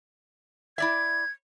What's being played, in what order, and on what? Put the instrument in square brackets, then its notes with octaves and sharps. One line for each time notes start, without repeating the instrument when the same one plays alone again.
[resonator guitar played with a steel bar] E4 D5 E5 [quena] G#6